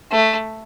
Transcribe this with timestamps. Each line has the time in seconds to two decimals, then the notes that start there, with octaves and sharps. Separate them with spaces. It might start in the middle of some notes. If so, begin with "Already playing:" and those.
0.11 A3